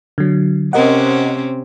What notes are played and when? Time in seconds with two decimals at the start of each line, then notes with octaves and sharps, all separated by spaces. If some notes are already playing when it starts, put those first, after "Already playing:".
0.18 D3 F#3
0.73 C3 C4 C#4 A#4 D#5 F#5